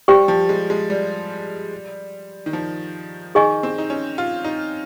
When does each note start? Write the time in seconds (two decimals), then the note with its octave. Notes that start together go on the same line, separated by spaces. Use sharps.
0.08 G3 G4 C5 G5 C#6
0.28 F3
0.49 G#3
0.70 G#3
0.90 G3
2.46 D#3
2.53 F3
3.35 D#3 G#4 D#5 G#5 C#6
3.63 C4
3.78 D#4
3.90 C#4
4.18 F4
4.45 D#4